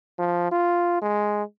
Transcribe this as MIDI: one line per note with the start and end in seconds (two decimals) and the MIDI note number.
0.19 0.50 53
0.51 0.97 65
1.02 1.43 56